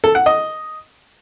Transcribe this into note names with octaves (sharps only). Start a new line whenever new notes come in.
A4
F#5
D#5